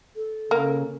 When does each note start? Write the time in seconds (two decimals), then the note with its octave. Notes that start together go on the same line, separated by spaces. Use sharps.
0.16 A4
0.51 C#3 A#3